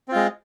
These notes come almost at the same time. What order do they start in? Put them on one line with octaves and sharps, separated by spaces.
C4 F4 G#3